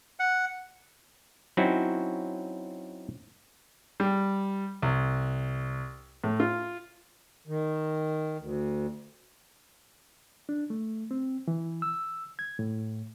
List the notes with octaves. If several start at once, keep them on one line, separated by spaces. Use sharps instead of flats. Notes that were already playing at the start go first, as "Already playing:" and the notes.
F#5
F#3 C4 C#4 D#4 E4 F#4
G3
C2
A2
F4
D#3
D2
D4
A3
C4
E3
E6
G#6
A2